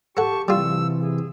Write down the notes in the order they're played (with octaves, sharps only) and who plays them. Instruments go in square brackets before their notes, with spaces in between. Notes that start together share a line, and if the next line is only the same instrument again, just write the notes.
[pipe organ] G4 C#6 [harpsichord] A4 F#5 [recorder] A5
[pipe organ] C3 E3 [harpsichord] G3 F4 [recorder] E6
[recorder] G#4